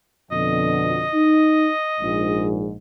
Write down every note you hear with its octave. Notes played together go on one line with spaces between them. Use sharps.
F2 B2 D3 D#5
D#4
A#1 G#2